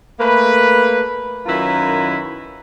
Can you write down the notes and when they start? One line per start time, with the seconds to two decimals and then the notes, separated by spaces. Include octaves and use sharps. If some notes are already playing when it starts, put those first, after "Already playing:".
0.20 A3 A#3 B4
1.46 F#2 D#3 E4 F4 B4 A#5